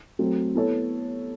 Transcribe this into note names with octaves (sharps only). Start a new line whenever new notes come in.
F#3 A3 C4
B3 E4 A4 C#5